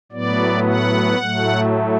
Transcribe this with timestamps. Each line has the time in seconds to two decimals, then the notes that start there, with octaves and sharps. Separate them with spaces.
0.12 A2 F#3 B3 D5
0.65 F#5
1.18 A2 F#3 A3